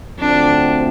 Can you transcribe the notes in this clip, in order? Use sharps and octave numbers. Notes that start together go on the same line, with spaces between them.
D2 D3 F3 A3 C4 D4